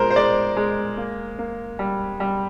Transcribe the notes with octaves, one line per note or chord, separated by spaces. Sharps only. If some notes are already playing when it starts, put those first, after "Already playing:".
Already playing: A#2 G#3 A#4 C5
C5
G#3 D5
G#3
A#3
A#3
G3
G3